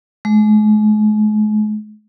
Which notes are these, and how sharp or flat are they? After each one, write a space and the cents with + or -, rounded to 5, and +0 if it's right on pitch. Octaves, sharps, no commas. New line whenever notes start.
G#3 +40